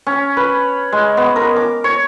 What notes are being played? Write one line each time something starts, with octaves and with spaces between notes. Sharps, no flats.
C#4
B4
G#3
B3
A#4
D6
C#5